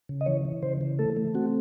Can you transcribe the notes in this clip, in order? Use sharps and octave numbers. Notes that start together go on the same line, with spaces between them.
C#3
D#5
E3 C#5
E3
C#3 C5
E3
A3 A4
A3
C4 F#4